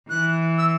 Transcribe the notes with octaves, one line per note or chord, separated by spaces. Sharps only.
E3 F#6
E6